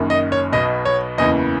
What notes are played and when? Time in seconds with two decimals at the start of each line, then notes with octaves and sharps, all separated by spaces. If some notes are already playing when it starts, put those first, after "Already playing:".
Already playing: F#1 F#2 D#3
0.10 D#5
0.32 C#5
0.52 B1 B2 D#5
0.85 C#5
1.18 F#1 E2 C#3 E3 D#5